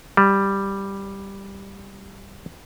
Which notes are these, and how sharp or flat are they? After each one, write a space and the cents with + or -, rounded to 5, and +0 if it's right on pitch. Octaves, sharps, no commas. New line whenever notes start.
G3 +0